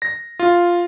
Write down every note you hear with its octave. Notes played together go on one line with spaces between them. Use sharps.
A#6
F4